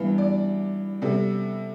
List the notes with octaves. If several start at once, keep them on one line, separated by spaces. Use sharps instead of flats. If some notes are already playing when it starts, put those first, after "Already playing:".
Already playing: G2 E3 B3
D5
C3 G3 B3 A4